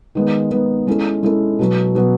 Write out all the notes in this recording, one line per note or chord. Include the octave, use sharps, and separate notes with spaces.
D#3 G#3 B3 D#4
D#3 G#3 B3 D#4
G#3 C#4 E4 A4
G#3 C#4 E4 A4
B2 F#3 B3
B2 F#3 B3